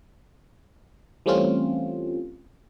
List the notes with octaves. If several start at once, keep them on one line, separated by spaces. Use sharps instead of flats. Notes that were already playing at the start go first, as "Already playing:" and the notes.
E3 G3 A3 C4 C#4 F4